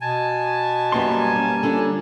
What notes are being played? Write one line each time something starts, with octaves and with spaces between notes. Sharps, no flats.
B2 G#5 A5
F#2 G3 A#3 B3 G4 C6
C#4
D3 C#4 F4